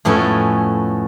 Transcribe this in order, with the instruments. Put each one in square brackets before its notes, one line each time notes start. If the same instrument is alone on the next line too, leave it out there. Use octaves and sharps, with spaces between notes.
[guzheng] F2 A2 B3 C#4 A4 G#5